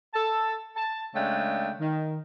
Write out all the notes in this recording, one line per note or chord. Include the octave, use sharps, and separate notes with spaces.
A4 A5
A5
C#3 G#3 A3 D4 G5
D#3